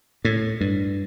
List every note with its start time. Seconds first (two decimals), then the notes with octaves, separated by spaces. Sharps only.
0.25 A2
0.61 G2